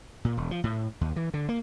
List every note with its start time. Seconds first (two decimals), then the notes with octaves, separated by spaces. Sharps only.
0.25 A#2
0.37 E1
0.51 F3
0.64 A2
1.01 D#2
1.16 E3
1.34 D3
1.49 A#3